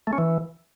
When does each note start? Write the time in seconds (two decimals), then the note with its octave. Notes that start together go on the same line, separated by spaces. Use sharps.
0.07 A3
0.13 C#4
0.18 E3